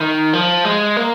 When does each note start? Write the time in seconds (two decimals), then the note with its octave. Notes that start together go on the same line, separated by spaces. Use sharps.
0.01 D#3
0.33 F3
0.65 G#3
0.97 A#3